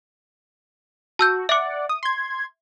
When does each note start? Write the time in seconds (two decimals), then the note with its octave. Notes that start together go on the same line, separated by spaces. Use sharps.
1.19 F#4 A5 E6 G6
1.49 D5 E5 F#5 D6
1.89 D#6
2.03 C6 G#6